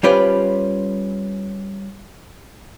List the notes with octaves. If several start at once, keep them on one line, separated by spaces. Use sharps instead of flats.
G3 C#4 F4 B4 C5 D5